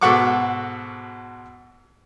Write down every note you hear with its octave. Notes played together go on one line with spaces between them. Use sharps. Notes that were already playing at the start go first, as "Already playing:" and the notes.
G#2 B2 A4 F#5 C#6 D6